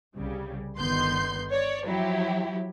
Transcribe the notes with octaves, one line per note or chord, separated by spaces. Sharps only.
C2 C#3 G3
G1 D3 D#3 B3 C6 G6
C#5 D5
F3 F#3 E4 G4